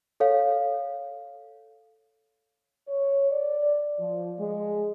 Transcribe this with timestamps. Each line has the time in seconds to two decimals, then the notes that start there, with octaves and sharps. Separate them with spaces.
0.20 A4 C#5 F5
2.88 C#5
3.31 D5
3.99 F3
4.40 G#3